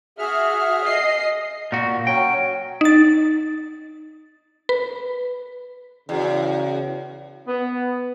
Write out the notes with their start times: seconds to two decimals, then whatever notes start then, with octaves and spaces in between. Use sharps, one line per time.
0.18 F#4 G#4 E5 F6
0.84 D#5 C7
1.72 A#2 F#4
2.07 F#3 C#4 F#4 G5
2.81 D#4 A6
4.69 B4
6.09 E2 C#3 E4 F#4
7.48 B3